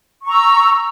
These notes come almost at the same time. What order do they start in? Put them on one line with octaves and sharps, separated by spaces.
C#6 A#5 E6